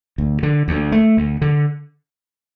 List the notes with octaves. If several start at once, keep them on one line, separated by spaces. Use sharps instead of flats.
D2
D3
D2
A3
D2
D3